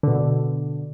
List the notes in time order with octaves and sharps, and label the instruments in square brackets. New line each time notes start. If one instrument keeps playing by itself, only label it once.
[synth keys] B2 D3